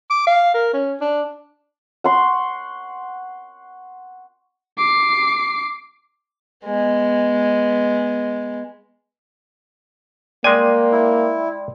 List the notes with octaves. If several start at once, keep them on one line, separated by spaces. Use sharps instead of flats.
D6
F5
A#4
C#4
D4
F#5 C6 C#6
D6 C7
G#3 B3
G#3 A#3 D5 G5 G#5 C6
E4